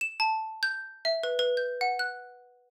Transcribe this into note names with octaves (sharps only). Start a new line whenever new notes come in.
E7
A5
G6
E5
B4
B4
G6
F#5
F#6